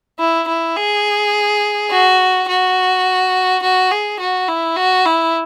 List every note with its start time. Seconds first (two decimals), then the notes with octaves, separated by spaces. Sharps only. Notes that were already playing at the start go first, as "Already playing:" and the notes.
0.19 E4
0.48 E4
0.76 G#4
1.91 F#4
2.48 F#4
3.62 F#4
3.91 G#4
4.20 F#4
4.49 E4
4.77 F#4
5.06 E4